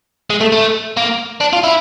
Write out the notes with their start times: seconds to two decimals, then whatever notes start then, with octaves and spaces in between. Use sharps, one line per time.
0.30 G#3
0.41 A3
0.52 A3
0.97 A#3
1.41 D4
1.53 F4
1.64 E4